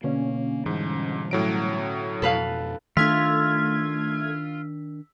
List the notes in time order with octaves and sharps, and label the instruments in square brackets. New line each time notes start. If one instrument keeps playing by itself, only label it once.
[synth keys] B2 D3 C#4 [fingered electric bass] A#3
[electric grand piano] G#2 [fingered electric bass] E3 G3
[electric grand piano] A2 F#3 D7
[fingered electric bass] F2 B2 [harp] A4 B4 F5
[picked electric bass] D#3 D4 [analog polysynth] A3 G#6 [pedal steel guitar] F4 [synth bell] E6 B6